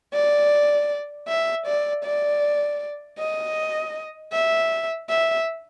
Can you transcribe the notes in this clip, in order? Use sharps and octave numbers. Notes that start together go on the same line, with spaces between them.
D5
E5
D5
D5
D#5
E5
E5